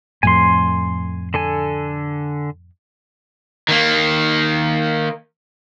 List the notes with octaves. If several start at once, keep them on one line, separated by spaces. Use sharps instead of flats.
F2 A2 G#5 C6
D3 A4 G#5
D#3 A#3